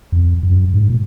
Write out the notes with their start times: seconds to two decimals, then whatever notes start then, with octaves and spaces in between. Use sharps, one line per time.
0.12 F2
0.43 F#2
0.74 G#2
0.90 A#2